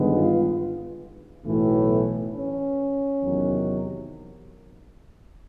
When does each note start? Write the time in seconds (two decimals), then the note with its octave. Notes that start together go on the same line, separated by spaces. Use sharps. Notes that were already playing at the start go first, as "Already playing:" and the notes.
Already playing: G1 G2 D#3 G#3 B3
0.12 F4
1.44 B1 A2 E3 A3
2.34 C#4
3.22 E2 C3 D#3 F#3